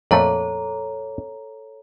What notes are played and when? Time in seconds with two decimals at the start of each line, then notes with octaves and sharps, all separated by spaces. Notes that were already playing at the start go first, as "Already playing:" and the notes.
0.11 F2 A#2 A3 A4 C#5 A#5